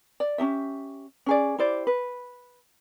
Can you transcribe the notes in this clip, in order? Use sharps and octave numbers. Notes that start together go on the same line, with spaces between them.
D5
C#4 D#4 G4 E5
C#4 G#4 D5
E4 G4 C5 D5
B4